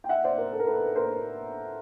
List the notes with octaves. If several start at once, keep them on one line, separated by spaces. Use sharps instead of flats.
G5
E5 F#5
C5 D5
A#4 C5
A4
A#4
A4 B4
A#4 C5